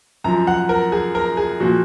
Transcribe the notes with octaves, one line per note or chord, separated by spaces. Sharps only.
F#2 F3 A#5
F#5
A#4
G#4
A#4
G#4
A#2 F3 F#4